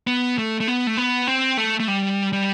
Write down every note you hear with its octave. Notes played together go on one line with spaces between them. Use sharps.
B3
A3
A3
B3
A3
B3
C4
A3
A3
G3
G3